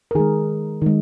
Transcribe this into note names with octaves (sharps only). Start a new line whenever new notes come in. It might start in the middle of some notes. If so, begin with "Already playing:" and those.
A#4
D#3 G#3 G#4
D#3 G#3